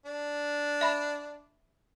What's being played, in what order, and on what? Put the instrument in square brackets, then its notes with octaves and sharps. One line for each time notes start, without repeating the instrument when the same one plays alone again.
[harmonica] D4
[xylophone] E5 B5